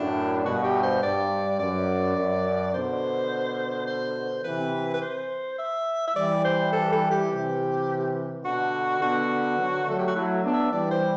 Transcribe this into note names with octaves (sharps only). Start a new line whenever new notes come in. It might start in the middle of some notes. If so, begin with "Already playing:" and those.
Already playing: F#2 A2 D4
G2 B2 F#4
G4
C5
G2 D5
F#2 D5
F#2
B2 D3 C5
C5
C3 E3 B4
B4
C5
E5
E5
E3 G3 D5
C5
A4
A4
G4
C3 E3
B2 D3 F#4
B2 D3 F#4
D3 F#3
F#3 A3 A4
G4
F#4
F#3 A3 E4
B3 D4
E5
E3 G3 D5
C5